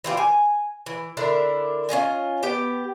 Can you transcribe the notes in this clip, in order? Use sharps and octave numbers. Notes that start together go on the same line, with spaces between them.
E3 F4 G4
G#5
E3
D3 D4 E4 A#4
C#4 F4 D#5 G#5
B3 G4 G5